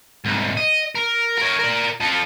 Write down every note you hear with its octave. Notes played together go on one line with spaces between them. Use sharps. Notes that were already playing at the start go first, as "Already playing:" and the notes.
C2 G#2
D#5
A#4
A#4 C#5
A#4 D5
F3 A4